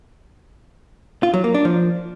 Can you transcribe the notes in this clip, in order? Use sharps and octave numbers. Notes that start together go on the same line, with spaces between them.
F4
F#3
A#3
D4
F3